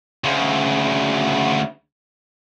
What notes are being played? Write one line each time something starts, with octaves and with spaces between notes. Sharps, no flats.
D2 C#3